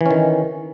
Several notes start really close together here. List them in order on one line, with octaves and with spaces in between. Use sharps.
E3 C#4 D#3